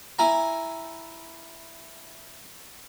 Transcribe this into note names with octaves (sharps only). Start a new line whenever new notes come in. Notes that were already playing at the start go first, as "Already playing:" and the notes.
E4 G#5 A#5